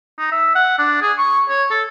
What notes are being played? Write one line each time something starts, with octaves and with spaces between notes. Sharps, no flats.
D#4
E5
F#5
D4
G#4
C#6
C#5
A4